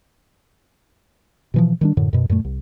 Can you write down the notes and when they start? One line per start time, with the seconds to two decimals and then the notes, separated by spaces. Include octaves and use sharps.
1.54 B2 E3 F3
1.81 D#3 G3 D4
1.97 F#2 A2 D3
2.13 F#2 B2
2.30 F#2 A#2 A3
2.45 C2